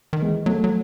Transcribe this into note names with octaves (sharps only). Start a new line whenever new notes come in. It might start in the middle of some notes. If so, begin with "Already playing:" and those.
D#3
E3 G#3
F#3 A3
F#3